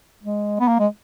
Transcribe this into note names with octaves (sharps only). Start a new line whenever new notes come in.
G#3
B3
A#3
G#3